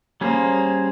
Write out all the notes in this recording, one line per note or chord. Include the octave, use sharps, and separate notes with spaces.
G3 A#3 C#4 G#4 C5